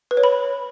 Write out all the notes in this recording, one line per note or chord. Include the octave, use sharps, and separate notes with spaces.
B4
C#5
B5